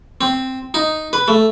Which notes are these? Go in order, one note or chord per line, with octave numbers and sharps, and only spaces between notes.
C4
D#4
B4
A3